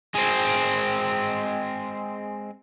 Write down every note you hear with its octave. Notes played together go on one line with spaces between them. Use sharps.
G#3 C4